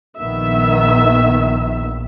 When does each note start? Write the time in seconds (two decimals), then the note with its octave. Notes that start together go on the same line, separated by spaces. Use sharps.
0.18 A#1 D#3 B3 E5